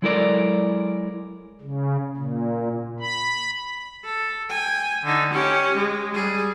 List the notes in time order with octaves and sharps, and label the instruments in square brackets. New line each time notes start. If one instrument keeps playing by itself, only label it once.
[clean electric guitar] F#3 G#3 E4 A4 A#4 D5
[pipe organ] C#3
A#2
B5
[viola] A4
G5 G#5
D3 D#4
C#4 G4
G#3
G3 G#4